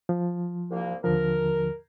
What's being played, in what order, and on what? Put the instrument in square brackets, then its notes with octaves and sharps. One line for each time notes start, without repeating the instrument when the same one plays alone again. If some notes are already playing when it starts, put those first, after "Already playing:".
[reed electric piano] F3
[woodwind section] C2 A#3
[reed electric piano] D#2 D3 F3 [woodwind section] A#4